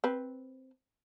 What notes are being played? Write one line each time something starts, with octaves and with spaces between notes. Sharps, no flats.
C4 B4